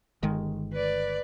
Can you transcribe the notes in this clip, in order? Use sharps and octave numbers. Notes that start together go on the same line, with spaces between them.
G1 D#3 G#3
B4 D5